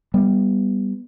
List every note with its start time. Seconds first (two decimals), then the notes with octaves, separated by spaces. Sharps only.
0.14 G3 B3